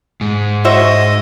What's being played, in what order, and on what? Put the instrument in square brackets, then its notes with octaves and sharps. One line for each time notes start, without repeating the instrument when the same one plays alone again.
[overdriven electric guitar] G#2
[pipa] F#4 C5 E5 [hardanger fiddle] D#5